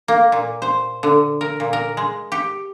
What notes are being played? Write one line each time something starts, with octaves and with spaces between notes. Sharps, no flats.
A#3
A#2
C5
D3
A#4
A#2
A#4
G#3
G4